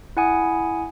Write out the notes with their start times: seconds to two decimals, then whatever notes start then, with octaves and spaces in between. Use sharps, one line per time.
0.17 E4 F#5 G#5 D#6